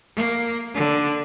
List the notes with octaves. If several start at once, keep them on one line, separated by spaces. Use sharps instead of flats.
A#3
D3